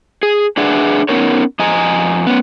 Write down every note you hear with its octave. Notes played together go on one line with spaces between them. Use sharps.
G#4
D4 G#4 B4 D5 E5 F#5
B3 C#4 D#4 A#4 C#5
F2 D#5 G#5 A#5
B3 C#4